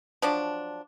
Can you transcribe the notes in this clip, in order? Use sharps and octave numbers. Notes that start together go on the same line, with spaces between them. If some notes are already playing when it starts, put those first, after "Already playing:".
F3 F#3 D4